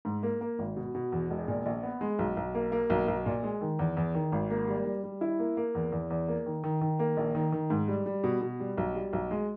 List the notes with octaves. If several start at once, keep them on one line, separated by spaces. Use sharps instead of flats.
G#2
A#3
A#3
G#1
B2
B2
E2
E1
A#2
A#1
B3
G#3
B1
B1
A#3
A#3
B1
B1
A#2
G#3
D#3
E2
E2
D#3
G#1
A#3
G3
G3
G3
E4
A#3
A#3
E2
E2
E2
A#3
D#3
D#3
D#3
A#3
A#1
D#3
D#3
G#2
G3
G3
B2
B2
G3
B1
G3
B1
G#3